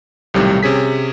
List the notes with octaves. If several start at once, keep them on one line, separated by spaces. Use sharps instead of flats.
B1 A2 C3 D#3 G3
C3 C#4 G#4 B6